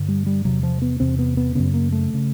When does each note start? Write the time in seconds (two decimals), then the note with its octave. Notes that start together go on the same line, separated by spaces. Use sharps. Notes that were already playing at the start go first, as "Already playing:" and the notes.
Already playing: G2 D3
0.08 G3
0.26 G3
0.45 E2 C3 F#3
0.63 F3
0.82 B3
1.00 E2 C3 C4
1.19 B3
1.37 B3
1.55 F#2 C#3 B3
1.74 A#3
1.92 A3
2.14 C#3